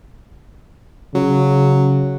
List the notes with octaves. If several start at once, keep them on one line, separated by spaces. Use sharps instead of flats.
C#3 F#3